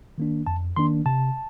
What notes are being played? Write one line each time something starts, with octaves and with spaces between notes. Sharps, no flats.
D#3 A#3 D4
F2 A5
D#3 A#3 D4 C6
C3 A5